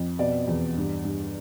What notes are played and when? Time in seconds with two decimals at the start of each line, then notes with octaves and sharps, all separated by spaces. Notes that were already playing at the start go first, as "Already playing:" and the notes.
Already playing: F2
0.19 B2 D5
0.48 E2
0.77 G2
1.04 G2